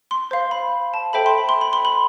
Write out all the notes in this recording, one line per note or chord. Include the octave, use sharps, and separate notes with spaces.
C6
C5 F5
B5
A5
A4 C5 E5 G5 B5
C6
B5
C6
B5
C6
B5